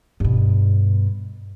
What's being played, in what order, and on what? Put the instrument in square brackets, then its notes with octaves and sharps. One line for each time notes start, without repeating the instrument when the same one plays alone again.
[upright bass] G2 B2